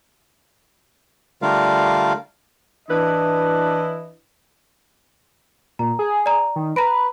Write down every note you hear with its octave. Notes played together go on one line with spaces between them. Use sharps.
D3 G3 A3 F4 A#4 F5
E3 D4 E4 B4 D#5
A#2 A#5
G#4
D5 A#5
D#3
B4 A#5 A#6 D7